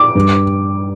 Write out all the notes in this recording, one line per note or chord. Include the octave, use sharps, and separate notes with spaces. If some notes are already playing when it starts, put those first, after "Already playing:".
Already playing: D6
G2